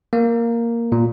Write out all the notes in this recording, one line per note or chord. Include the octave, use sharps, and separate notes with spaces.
A#3
A#2